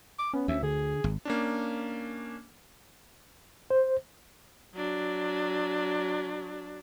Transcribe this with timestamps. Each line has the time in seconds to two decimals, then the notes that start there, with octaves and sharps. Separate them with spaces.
0.19 D6
0.34 B3 C#4
0.48 D2 E5
0.63 D3 G#4
1.04 G#1
1.25 A#3 C#4 D4
3.70 C5
4.75 F#3 D4